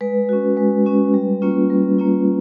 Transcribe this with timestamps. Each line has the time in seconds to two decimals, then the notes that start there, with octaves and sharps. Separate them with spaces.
0.01 G#3 B4
0.29 C#4 F#4
0.57 G#3
0.86 C#4 F#4
1.14 G3
1.42 A#3 C#4 F4
1.70 G3
1.98 A#3 C#4 F4